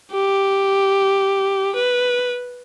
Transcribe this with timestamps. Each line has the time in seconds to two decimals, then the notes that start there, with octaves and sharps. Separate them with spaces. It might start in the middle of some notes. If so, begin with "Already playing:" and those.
0.12 G4
1.75 B4